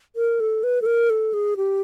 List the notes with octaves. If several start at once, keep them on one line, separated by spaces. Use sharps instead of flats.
A#4
A4
B4
A4
A#4
A4
G#4
G4